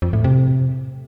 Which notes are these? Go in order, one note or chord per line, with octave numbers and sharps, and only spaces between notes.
F2
A2
C3